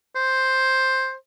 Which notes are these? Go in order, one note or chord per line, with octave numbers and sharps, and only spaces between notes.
C5